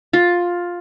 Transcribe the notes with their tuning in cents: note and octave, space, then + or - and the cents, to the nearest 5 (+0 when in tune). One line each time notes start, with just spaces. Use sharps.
F4 +10